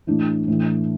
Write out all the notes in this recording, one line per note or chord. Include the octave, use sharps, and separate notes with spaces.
A2 E3 D4
A2 E3